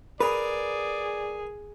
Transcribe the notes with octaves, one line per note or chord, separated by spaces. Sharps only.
G#4 A#4 B4 D5 D#6